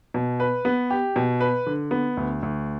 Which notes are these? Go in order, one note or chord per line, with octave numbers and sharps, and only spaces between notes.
B2
B4
B3
G4
B2
B4
D3
B3
D2
D2